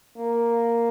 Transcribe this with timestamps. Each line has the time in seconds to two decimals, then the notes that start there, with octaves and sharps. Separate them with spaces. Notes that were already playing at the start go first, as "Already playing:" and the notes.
0.18 A#3